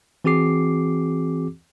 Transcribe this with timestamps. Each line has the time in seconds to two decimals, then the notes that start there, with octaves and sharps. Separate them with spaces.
0.24 E3 C4 F#4 G#4 D6 C7